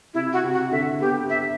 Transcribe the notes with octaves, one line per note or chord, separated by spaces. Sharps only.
C3 E4
F#4
C3
F#4
D3 E5
B3 G4
E5